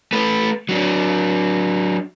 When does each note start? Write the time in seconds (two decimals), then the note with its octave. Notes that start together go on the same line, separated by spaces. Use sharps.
0.13 A3 B4
0.69 F#3 D4